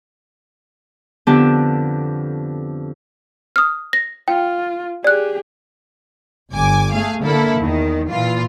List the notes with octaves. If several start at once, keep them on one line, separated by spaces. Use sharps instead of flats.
F2 D3 B3 D4 G4 A5
D#6 F6
A#6
F4 G5
G4 G#4 D5 F#6
G1 G#5 D6
A3 G#4 F5
D3 A#3 E4 A4
E2 D#3
A#2 E3 F4